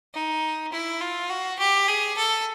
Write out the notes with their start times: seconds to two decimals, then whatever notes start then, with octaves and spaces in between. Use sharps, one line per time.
0.14 D#4
0.72 E4
1.01 F4
1.29 F#4
1.59 G4
1.88 G#4
2.17 A4